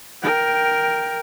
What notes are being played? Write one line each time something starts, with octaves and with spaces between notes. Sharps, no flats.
A#4 G5